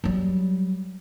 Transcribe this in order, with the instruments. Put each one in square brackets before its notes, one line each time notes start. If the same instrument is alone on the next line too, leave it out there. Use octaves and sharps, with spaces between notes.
[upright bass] F#3 G3